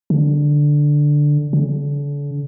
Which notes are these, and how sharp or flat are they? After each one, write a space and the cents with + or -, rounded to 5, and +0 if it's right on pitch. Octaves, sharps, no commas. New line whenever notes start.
D3 +0
D3 -40